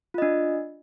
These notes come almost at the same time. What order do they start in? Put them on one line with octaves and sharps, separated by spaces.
F4 D#5 D4